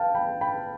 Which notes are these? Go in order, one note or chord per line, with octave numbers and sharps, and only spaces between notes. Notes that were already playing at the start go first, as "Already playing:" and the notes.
Already playing: F5 G5 A5
G5 B5
G5 B5